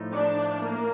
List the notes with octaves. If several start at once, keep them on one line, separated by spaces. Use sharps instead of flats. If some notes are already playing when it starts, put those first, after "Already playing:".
Already playing: A2 F3 A3 D#4
D4
A#3